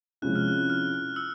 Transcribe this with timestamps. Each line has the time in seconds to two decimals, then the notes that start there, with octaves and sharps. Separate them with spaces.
0.22 C3 F3 G#3 C#4 E4 F#6
0.36 F6
0.48 F#6
0.70 F6
1.16 E6